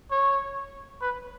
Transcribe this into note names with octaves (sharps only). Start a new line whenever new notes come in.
C#5
B4